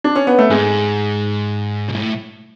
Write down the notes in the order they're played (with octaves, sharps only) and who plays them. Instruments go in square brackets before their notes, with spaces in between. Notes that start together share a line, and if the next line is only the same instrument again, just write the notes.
[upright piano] D4
C#4
B3
A3
[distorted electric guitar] G#2 [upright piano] G#3
[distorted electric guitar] B2
A2